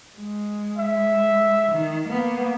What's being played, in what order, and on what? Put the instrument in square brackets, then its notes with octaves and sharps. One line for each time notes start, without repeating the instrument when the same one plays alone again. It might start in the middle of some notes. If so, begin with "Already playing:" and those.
[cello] G#3
[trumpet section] E5
[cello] D#3
A#3 B3